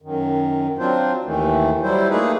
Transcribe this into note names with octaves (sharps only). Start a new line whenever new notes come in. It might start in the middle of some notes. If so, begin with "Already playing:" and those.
F#2 D#3
F#3 C4 D4 F4 C5
D#2 D#3 E3 A3
F#3 G3 E4 C5
A3 A#3 D#4 G#4 B4